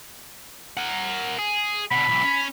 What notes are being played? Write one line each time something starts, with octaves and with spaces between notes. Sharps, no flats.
A#4 F#5
G#4
B2 D3 B5
B1 E3
C#4